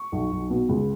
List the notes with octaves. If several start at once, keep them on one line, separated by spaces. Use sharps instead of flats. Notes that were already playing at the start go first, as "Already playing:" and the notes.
Already playing: C#6
B1
B1
B2
C#2